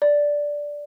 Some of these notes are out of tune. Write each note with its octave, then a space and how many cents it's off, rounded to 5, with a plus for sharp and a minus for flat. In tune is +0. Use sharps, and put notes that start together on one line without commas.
D5 -5